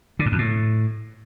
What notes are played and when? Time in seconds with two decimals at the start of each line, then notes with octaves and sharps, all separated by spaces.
0.19 D3
0.26 G#2
0.32 F2
0.38 A2